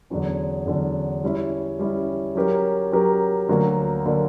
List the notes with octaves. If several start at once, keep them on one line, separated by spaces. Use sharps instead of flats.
E2 D3 F#3 C#4
E2 D3 F#3 C#4
G3 C#4 E4
G3 C#4 E4
F#3 C#4 G4 A#4
F#3 C#4 G4 A#4
D2 D3 F#3 A#3
D3 F#3 A#3